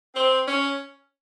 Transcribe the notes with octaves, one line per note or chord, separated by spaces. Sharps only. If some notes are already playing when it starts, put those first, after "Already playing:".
C4
C#4